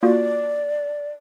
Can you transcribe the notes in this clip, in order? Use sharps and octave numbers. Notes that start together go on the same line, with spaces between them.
A#3 F4 F#4 D5